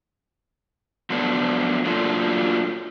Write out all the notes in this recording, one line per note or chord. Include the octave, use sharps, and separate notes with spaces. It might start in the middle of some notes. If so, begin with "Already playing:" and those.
F3 F#3 A3 B3 D4
F#3 A3 A#3 D4 F4